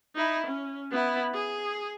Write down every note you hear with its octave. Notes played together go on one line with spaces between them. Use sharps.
D#4 E4
C#4
B3 E4
G#4